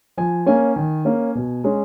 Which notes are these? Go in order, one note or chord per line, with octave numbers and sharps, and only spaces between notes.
F3 G#5
A#3 C#4 G#5
D#3
A#3 C#4
B2
G#3 C#4